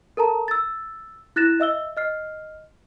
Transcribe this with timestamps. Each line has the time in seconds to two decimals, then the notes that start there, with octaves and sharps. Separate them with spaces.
0.17 A4 A#4 A5 A#5
0.48 E6 A6
1.36 E4 F#6 A6 A#6 E7
1.60 D#5 E5 E6 G7
1.97 D#5 F6 C7